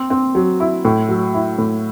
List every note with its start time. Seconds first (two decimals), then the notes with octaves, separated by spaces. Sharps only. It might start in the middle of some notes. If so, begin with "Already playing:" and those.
Already playing: C4
0.10 C4
0.35 F#3
0.60 E4
0.85 A2
1.09 F#3
1.34 E4
1.58 A2